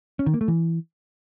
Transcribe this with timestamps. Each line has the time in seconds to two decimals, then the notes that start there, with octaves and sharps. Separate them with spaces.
0.19 C#4
0.26 D#3
0.34 A#3
0.41 A3
0.48 E3